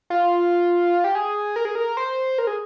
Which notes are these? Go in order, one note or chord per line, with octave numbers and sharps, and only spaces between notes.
F4
G4
G#4
A#4
G#4
A#4
C5
A#4
G#4